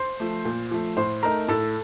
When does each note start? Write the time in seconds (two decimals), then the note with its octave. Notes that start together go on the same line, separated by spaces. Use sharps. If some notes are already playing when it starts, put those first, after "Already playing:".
Already playing: C5 C6
0.20 F3 A3
0.45 A#2
0.71 F3 A3
0.97 A2 C5 C6
1.23 A3 D#4 A#4 A#5
1.48 A2 A4 A5